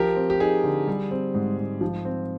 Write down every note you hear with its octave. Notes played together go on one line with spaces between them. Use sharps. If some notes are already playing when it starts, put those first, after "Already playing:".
Already playing: F3 G4 A#4
C4
G4
D#4 G#4
D3
G3
C4
G#2
G#2
F3
C4